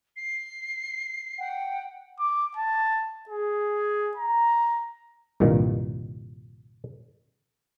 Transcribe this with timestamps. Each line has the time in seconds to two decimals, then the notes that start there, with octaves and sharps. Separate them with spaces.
0.16 C7
1.38 F#5 G5
2.19 D6
2.57 A5
3.29 G#4
4.17 A#5
5.40 C2 G2 A#2 D#3